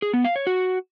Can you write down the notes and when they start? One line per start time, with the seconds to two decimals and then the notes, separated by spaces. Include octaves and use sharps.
0.02 G#4
0.13 B3
0.24 F5
0.36 C#5
0.47 F#4